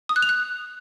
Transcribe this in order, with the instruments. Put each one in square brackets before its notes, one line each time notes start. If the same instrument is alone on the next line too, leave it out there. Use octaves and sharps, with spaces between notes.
[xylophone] D#6
F#6
F7
F#6